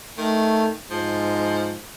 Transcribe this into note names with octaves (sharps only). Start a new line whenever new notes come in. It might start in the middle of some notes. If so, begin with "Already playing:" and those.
D#3 A3
G#2 F3